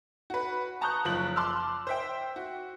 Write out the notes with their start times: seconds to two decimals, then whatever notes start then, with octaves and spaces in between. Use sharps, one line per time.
0.30 F#4 B4
0.81 A5 A#5 C#6 D#6 F#6 G6
1.05 F#1 F3 F#6 F#7
1.36 A5 C6 D6 E6 F6
1.87 C5 E5 G5
2.36 F#4